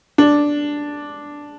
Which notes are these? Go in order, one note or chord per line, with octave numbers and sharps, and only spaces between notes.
D4